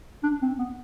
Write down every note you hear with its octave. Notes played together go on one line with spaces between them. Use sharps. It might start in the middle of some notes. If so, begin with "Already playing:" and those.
D4
C4
B3